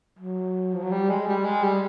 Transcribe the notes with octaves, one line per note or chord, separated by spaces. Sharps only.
F#3
F3
F#3
G3
G#3
G3
G#3
G3